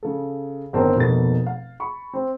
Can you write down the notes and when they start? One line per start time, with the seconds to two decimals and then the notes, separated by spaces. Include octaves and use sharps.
0.03 C#3 A4
0.73 G1 D#3 C4 A#4 A5
0.96 F1 B2 A#3 A4 A6
1.47 F5
1.80 B5 C#6
2.13 C4